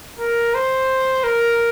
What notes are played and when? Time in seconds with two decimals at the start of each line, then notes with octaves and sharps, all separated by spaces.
0.19 A#4
0.55 C5
1.24 A#4